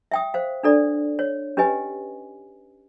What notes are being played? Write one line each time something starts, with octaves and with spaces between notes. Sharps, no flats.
E5 G5 D#6
C5 F5
D4 A4 D5
C#5
C#4 G4 B4 D#5 G#5